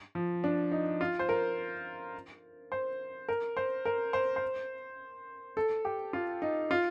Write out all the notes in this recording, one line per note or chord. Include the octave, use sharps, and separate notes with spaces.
F3
D4
D#4
F4
C5
A#4
C5
A#4
C5
A#4
C5
C5
A4
G4
F4
D#4
F4